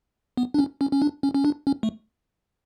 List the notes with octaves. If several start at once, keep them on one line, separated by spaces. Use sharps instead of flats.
B3
D4
C#4
C#4
C#4
D4
C#4
C#4
D4
C#4
A3